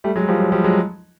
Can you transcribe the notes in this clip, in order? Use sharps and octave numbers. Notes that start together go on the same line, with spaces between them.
G3 A3
F#3 G#3
F3 G3
F#3
F3 G3
F#3 G#3